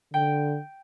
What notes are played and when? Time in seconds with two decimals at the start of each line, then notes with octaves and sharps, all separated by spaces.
0.14 D3 G5